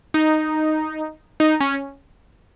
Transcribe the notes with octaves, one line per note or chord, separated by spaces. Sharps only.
D#4
D#4
C#4